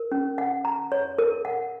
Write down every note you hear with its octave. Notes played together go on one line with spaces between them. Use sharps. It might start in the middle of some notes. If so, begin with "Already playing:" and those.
Already playing: A#4
C#4
F#5
A#5
C#5
A#4
F#5